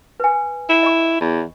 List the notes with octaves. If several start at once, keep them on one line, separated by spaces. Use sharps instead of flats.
B4 G#5
E4
D#5 B5 C#6
E2